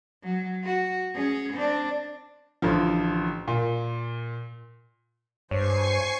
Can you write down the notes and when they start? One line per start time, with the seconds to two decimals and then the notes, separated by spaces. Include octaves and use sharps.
0.23 F#3
0.63 F#4
1.14 C#4 G#4
1.53 C4 D4
2.62 A1 D3 F3
3.48 A#2
5.51 G2 C5 C#5 G#5 C#6 C7